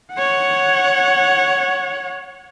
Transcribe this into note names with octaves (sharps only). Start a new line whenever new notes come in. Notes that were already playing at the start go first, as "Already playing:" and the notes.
C#5 F#5